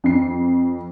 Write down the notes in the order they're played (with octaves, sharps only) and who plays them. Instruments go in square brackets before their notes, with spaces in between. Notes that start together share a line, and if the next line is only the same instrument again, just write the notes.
[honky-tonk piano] F2 C7